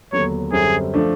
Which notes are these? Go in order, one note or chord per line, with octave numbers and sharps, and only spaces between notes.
D#2 D3 F#3 B3 C#5
F#2 D3 G3 C4 G#4
F3 A3 D4